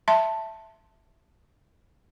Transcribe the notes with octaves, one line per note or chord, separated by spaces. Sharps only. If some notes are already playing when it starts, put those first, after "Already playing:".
E5 A5 C6